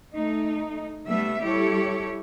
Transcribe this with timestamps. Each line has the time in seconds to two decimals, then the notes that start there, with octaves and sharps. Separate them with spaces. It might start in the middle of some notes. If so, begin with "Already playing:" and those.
0.14 A3 D#4
1.06 G3 A3 B3 E5
1.42 G3 E4 G4 A4 C#5